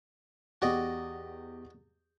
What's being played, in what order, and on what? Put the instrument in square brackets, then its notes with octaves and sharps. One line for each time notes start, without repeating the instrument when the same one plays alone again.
[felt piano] E2 G4 [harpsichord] F#4 D5 D#5